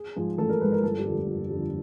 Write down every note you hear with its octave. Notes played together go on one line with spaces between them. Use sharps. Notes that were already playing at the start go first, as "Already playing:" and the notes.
Already playing: G#4
G#2 F3 G#3
A1 A4
A#4
G#2 F3 G#3 B4
A#4
G1 A4
G4
F2 D3
G1
F2 D3